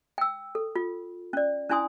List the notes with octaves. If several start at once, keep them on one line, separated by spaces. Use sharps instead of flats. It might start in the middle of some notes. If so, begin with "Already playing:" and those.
G5 E6
A4
F4
C#4 D5
C#4 D4 E4 G#5 C6 D#6